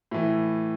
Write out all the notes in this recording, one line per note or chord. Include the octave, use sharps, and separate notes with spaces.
A2 E3